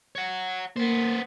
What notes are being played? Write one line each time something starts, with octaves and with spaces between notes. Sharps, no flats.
C#5 F#5
A#3 B3 C5